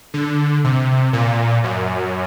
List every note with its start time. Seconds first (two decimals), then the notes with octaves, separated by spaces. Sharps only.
0.14 D3
0.64 C3
1.13 A#2
1.64 F#2